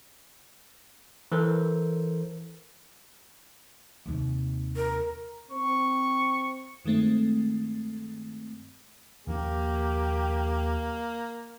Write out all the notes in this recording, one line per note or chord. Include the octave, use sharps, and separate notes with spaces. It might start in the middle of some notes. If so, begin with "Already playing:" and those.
E3 A4 A#4 C5
D#2 C3
A#4
C4 C#6
G2 D#3 G#3 A3 C4
D#2 F3 A#3 C#4 G4